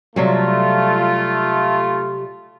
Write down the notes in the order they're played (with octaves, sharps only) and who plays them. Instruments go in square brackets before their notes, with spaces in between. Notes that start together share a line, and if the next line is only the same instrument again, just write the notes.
[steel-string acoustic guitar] C3 F#3 G3 [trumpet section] A3 F4